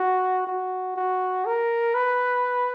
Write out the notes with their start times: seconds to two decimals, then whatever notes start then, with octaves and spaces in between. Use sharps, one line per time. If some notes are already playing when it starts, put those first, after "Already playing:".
Already playing: F#4
0.47 F#4
0.96 F#4
1.46 A#4
1.94 B4